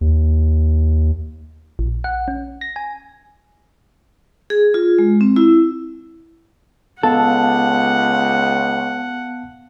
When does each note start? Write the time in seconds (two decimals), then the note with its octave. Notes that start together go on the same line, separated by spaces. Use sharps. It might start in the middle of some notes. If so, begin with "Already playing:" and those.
0.01 D#2
1.79 A#1
2.04 F#5
2.28 C#4
2.61 A#6
2.76 G#5
4.50 G#4
4.74 F4
4.98 G#3
5.21 C4
5.36 E4
7.03 C#2 B3 A4 F5 F#5 A5